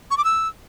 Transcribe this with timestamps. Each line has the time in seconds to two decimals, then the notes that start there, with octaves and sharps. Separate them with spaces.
0.11 C#6
0.18 D6
0.25 E6